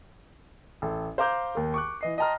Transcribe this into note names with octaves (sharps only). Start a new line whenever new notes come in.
A1 A4
C5 F5 A#5 D6 G6
D#2 A#4
C#6 D6 F#6
E3 D#5 C7
D#5 G5 A5 A#5 C6 F6